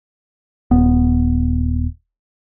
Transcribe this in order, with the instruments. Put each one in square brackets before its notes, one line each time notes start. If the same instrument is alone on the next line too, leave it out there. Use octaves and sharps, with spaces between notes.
[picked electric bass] D#1 B3